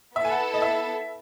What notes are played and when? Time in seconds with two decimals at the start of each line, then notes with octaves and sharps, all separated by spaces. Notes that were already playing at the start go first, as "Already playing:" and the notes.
0.16 B3 E4 A4 E5
0.25 G#5
0.31 F#5
0.54 D#5
0.62 E5